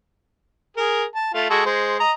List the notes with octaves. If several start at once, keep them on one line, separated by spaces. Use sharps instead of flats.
G#4 A#4
A5
A3 F4
G#3 F#4 A4
G#3 C5
D#5 A#5